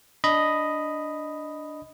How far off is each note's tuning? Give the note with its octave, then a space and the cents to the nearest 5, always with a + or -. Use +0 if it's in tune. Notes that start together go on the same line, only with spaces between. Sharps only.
D4 +0 D#5 +0 B5 +0